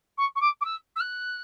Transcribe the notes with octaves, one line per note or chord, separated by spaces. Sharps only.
C#6
C#6
D6
D6
E6
E6
F#6